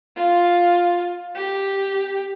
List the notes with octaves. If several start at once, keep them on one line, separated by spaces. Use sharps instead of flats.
F4
G4